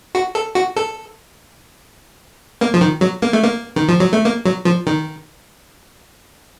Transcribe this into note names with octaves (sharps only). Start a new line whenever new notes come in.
F#4
A4
F#4
A4
A#3
F3
D#3
F#3
A#3
A3
A#3
D#3
F3
F#3
A3
A#3
F#3
F3
D#3